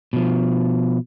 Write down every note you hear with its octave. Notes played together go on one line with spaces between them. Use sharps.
B2 F3